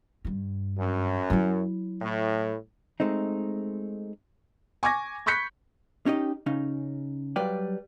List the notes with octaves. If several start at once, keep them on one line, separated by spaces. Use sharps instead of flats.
G2 G3
F#2
F#3 E4
A2
G#3 A3 C4 D#4
G#5 C#6 D6 G#6 A#6
B5 C#6 F#6 G6 B6 C#7
C#4 D#4 G4 D#5
C#3 C#4 D#4
F#3 G3 B4 D5 F5 G5